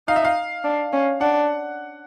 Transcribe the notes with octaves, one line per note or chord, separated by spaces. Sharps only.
D#4 F5
E5
F5
D4
C#4
D4 F#5